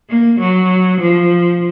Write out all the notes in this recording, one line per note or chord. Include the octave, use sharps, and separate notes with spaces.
A#3
F#3
F3